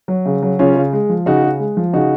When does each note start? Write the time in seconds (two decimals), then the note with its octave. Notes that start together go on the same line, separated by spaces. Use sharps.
0.08 F#3
0.26 C#3
0.42 F#3
0.59 C#3 C#4 F4
0.76 C#3
0.93 G#3
1.09 F3
1.26 C#3 D#4 F#4
1.43 C#3
1.60 G#3
1.77 F3
1.93 C#3 D#4 F#4